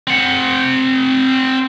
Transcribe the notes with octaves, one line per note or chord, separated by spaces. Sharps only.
C4 F#5